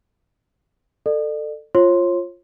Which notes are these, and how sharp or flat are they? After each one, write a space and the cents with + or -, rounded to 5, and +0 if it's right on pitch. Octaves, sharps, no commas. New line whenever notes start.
A4 +15 D5 +40
F4 +0 C#5 -40 C6 +0